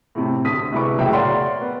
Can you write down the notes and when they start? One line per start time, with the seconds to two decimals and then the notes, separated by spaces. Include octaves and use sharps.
0.15 A2 C3
0.45 D2 D3 D#6 B6
0.72 C2 G#3 E4 B4 C#6 D6
0.98 E1 C#2 A2 F#3 E5 G5
1.13 A#4 C#5 D5 F5 F#5 C6
1.61 B3